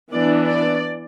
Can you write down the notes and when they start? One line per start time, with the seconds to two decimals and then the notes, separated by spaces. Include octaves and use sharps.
0.13 E3 B3 D4 D5
0.46 D5